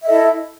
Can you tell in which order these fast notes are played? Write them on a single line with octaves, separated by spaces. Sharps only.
E5 D#5 A4 E4